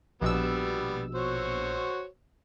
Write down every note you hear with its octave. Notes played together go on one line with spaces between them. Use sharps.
A#1 B2 G3 B3 E6
F#4 C5 C#5